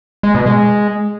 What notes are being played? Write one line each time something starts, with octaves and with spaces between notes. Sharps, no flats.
G#3
B2
G#3